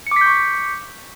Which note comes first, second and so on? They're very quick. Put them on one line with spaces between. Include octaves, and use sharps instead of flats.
C#7 D6 B6 G6 C#6